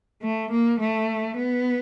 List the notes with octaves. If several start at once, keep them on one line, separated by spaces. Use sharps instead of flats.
A3
A#3
A3
B3